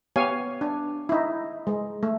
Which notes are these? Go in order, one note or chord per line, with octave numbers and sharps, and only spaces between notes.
B3 G4 C#5 F5 G#5
D4
D#4 E4
G#3
A3